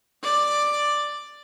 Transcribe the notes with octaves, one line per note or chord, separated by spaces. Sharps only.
D5